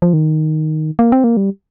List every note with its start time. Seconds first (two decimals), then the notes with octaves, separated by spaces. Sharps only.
0.02 F3
0.13 D#3
0.99 A#3
1.12 C4
1.24 A#3
1.37 G3